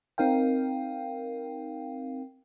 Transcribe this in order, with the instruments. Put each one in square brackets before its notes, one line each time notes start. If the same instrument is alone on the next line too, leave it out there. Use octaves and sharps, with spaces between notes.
[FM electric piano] C4 D#4 A#4 F5 G5